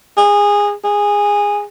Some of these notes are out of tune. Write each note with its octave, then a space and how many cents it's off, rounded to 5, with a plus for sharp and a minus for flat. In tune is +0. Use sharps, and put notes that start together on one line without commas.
G#4 -20
G#4 -15